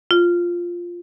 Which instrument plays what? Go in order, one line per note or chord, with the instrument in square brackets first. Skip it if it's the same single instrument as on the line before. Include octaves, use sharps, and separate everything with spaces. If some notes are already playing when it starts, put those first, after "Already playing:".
[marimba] F4